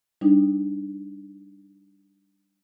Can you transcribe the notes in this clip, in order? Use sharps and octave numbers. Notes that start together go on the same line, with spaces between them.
G3 D4 D#4